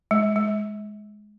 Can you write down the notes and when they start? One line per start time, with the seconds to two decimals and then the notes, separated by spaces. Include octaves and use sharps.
0.11 G#3
0.36 G#3